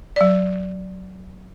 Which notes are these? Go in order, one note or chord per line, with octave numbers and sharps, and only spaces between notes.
F#3 D5